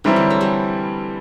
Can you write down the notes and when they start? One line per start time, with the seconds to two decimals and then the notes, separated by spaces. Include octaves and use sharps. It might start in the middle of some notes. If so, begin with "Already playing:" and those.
0.04 E3 F#3 G3 C4 E4
0.16 D3
0.30 A3
0.41 G3